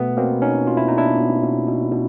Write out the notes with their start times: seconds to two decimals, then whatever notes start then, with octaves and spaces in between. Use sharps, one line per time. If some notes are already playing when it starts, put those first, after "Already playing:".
Already playing: B2 A3 B3
0.17 B2 A#3 C4
0.42 B2 C#4 D#4
0.67 B2 F4
0.77 E4
0.88 B2 D#4
0.97 D4 E4
1.17 B2
1.43 B2
1.68 B2
1.92 B2